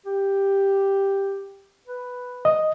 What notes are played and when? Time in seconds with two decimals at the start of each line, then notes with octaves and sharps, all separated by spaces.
0.06 G4
1.87 B4
2.45 D#5